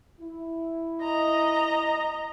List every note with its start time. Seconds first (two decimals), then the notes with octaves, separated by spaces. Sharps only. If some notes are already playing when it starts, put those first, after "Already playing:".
0.20 E4
1.03 D#5 A#5 A#6